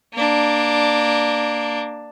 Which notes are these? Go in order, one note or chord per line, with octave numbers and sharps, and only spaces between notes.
A#3 D4